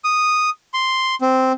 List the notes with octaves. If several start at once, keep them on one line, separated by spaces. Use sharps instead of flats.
D#6
C6
C4